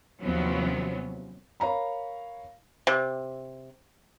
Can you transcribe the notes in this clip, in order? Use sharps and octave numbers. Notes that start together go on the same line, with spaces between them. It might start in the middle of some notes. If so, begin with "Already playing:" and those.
D#2 C3 F3 F#3 B3 C#4
A#4 C#5 F5 A#5 B5
C3